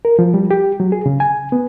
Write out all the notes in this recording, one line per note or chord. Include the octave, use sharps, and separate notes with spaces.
A#4
F3
G3
G4
F#3
G#4
C#3
G#5
B3